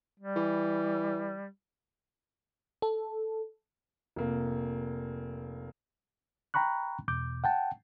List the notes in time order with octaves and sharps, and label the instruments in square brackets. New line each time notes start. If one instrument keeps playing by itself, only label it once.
[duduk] G3
[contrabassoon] E3
[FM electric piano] A4
[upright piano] F1 A#3
[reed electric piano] G5 A#5 B5 C#6 F#6
E2 B2 D6 G6
F#5 G5 A5